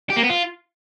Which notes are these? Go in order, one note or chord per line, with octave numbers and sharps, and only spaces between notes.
G4
A#3
B3
F4